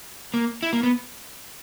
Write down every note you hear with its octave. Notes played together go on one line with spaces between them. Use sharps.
A#3
E4
A#3
B3